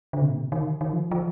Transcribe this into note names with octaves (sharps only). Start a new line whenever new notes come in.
D3
C3
A#2
C3
D#3
D#3
F3
F3